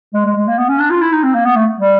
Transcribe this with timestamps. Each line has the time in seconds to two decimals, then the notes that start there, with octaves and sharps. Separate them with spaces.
0.14 G#3
0.26 G#3
0.36 G#3
0.48 A#3
0.58 B3
0.69 C#4
0.79 D4
0.90 F4
1.01 E4
1.12 D#4
1.23 C4
1.34 A#3
1.45 B3
1.56 A3
1.78 G3